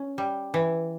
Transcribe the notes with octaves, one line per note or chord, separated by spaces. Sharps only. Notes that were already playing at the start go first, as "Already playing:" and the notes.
Already playing: C#4
G3
E3